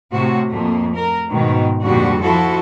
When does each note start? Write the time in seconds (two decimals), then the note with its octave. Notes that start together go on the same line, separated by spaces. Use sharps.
0.13 A2 C3 F#4
0.51 F2 A3 A#3
0.94 A#4
1.30 G#2 B2 D#3
1.82 F2 A#2 D3 G3 F#4
2.22 F3 E4 F#4 A4